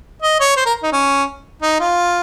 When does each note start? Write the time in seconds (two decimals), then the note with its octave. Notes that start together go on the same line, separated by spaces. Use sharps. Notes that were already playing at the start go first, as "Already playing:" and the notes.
0.22 D#5
0.40 C#5
0.56 C5
0.65 A#4
0.83 D#4
0.92 C#4
1.62 D#4
1.80 F4